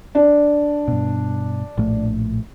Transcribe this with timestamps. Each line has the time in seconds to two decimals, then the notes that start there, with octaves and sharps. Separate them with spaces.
0.15 D4
0.88 G2 B2
1.77 A#1 A2 A3